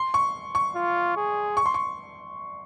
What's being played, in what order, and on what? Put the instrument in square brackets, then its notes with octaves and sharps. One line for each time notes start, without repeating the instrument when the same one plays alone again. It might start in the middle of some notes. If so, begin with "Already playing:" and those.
Already playing: [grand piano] C6
C#6
C#6
[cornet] F4
G#4
[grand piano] C#6
C6
C#6